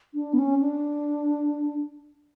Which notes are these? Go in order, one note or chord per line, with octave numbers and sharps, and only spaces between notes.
D4
B3
C#4
D4